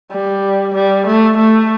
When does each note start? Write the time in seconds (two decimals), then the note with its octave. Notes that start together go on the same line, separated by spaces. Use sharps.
0.12 G3
0.74 G3
1.07 A3
1.37 A3